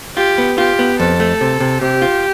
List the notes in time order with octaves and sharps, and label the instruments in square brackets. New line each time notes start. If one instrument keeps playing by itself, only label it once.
[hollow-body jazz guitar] F4 [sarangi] G4
[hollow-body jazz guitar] B3
[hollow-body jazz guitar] F4 [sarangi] G4
[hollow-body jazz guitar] B3
[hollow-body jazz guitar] F2 [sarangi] A4
[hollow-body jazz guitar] A3
C3
C3
[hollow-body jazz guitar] C3 [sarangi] G4
[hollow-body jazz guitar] F4